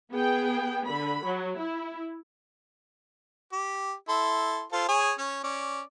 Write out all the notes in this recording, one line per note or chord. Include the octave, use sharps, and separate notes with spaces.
B3 G#4 G5
D3 B5
F#3
E4
G4
E4 A4 C6
F4 A4 C5
G#4 C#5 G#5
C#4 C#5
C#4 D5